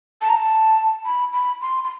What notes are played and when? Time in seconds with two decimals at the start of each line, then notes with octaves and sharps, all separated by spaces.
0.21 A5
0.29 A#5
0.37 A5
1.05 B5
1.33 B5
1.61 C6
1.84 C6